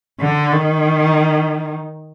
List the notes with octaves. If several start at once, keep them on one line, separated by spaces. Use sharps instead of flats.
D3
D#3